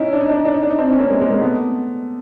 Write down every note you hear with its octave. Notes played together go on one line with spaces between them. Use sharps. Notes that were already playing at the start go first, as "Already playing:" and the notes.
Already playing: C#4 D#4 E4
D4
D#4
D4
D#4
D4
D#4
D4
D#4
C4 D4
C#4
A#3 C4
G#3 A#3
G#3 A#3
G#3 A#3
A3 B3